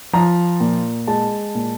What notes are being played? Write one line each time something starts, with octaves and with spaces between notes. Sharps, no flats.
F3 A#5
A#2
G#3 A5
A#2